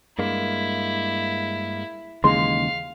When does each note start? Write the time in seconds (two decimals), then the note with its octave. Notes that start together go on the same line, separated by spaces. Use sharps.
0.19 G2 G#3 A#3 E4
2.24 D#2 C#3 E3 G#3 F5 C6